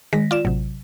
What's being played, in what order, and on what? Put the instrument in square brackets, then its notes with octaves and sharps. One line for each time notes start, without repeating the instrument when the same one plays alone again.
[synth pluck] D#3 A#6 B6 [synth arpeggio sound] G#3
[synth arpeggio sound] F4 D5 E7
[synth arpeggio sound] A1 [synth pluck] C3 F#3